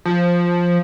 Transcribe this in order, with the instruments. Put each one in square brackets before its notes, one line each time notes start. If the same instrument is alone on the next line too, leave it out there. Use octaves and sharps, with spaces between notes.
[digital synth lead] F3